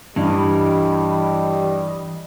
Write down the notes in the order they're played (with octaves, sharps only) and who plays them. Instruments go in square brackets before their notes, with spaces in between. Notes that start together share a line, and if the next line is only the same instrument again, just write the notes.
[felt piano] G2 [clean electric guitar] E3 [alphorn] G3 [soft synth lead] D#5